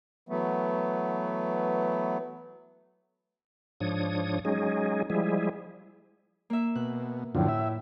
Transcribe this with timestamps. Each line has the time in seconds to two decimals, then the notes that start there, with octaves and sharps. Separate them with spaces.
0.29 E3 F#3 A3 B3
3.80 G#2 F3 D4 C#5 D#6
4.45 F#3 G#3 C#4 D#4 G#4
5.10 F3 G3 G#3 E4 G#4
6.50 A#3 E5
6.76 B2 F#6
7.35 F#2 A2 D3 F3
7.48 E5